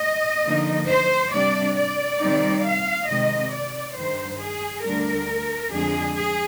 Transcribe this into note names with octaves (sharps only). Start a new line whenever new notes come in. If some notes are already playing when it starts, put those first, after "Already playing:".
Already playing: D#5
D3 F3 A#3 D#4
C5
C3 G3 D4 D5
D5
C3 D#3 G3 C4 D#4
F5
C3 D#3 G#3 D#5
D5
G2 D#3 G3 C5
G#4
D2 D3 G3 D4 A#4
F2 D3 F3 G#3 D4 G#4
G#4